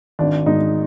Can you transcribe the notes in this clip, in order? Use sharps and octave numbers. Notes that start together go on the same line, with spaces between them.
G#1 D4
G#2 D#4